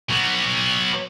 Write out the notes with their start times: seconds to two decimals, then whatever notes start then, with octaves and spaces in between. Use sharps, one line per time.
0.10 F#3 B3